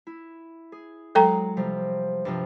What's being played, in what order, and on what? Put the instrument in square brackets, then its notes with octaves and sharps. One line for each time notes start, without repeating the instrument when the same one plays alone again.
[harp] E4
G#4
[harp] F#3 G#3 [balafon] A4 G5 A#5
[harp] C3 F3 G3
G2 C3 F3